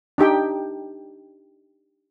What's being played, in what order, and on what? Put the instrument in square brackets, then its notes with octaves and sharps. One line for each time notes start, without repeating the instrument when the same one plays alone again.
[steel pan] D4 D#4 G4 G5